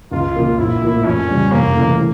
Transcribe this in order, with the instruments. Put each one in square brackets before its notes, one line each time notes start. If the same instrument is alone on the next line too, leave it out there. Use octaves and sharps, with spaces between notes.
[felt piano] C#2 [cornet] F4
[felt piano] C#3 F3 A#3
[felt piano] A#1 [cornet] E4
[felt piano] A2 F3 A#3
[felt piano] F2 [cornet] C#4
[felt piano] C#3 G3 D4
[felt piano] F1 [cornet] A#3
[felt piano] F2 C#3 E3 A3
A2